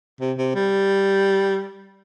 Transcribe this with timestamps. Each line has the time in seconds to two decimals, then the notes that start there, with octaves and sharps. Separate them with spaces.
0.21 C3
0.38 C3
0.55 G3